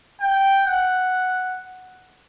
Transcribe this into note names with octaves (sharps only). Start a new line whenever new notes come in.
G5
F#5